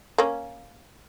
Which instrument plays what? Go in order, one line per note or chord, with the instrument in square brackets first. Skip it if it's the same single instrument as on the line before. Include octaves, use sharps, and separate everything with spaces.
[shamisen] A#3 C#4